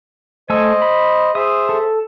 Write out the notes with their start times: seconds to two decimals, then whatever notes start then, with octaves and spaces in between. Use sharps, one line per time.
0.50 A3 C5 D#5 G#5 E6
0.82 B5
1.35 G#4 C5 E5 D#6
1.69 A4